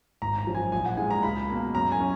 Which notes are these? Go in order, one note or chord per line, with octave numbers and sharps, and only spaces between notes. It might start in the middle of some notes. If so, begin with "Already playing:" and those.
G#1 A#5
A#5
F#2 F3
G#5
A#1 G#5
F#5
A#2 G#3 G#5
A#5
C#2 B5
B2 A#3
F#2 A#5
G#5
C#4